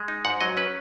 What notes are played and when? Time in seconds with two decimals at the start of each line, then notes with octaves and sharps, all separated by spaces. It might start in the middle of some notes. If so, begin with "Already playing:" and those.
Already playing: G#3
0.08 D#4
0.25 G#2 F#5
0.41 F#3 D#5
0.57 C#4 B4